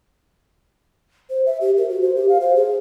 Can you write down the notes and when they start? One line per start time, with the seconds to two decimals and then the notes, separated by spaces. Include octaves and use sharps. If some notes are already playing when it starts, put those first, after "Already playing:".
1.30 C5
1.46 E5
1.61 G4
1.77 A#4
1.90 F#4
2.02 C5
2.16 G4
2.29 F5
2.41 C5
2.55 G#4